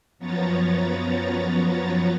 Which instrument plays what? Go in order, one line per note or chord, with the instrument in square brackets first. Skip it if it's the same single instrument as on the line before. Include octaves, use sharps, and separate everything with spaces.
[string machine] F#2 F3 B3 C#5 A#5 A6